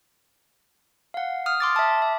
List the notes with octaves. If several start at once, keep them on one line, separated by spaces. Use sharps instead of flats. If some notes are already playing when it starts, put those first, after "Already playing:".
F5 F#5
D#6 F6
C6 D6 A6
E5 A5
E5